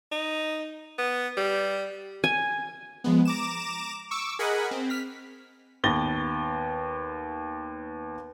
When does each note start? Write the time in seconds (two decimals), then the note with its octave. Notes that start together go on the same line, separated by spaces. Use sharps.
0.12 D#4
0.98 B3
1.37 G3
2.24 G#5
3.04 F3 G#3 B3
3.25 A#5 D6 E7
4.11 C#6 D6 E6
4.39 G#4 A#4 D#5 F#5 G#5 B5
4.71 C4
4.90 F6 B6
5.84 D#2 B3 B4 A6 A#6 G7